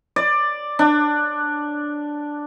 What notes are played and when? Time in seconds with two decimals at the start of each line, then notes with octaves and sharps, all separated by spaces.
0.16 D5
0.79 D4